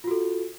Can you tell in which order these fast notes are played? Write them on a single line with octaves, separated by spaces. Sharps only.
F4 F#4 A4